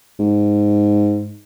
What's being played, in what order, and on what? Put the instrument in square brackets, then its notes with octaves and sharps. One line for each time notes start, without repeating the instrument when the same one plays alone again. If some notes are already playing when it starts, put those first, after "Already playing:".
[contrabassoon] G#2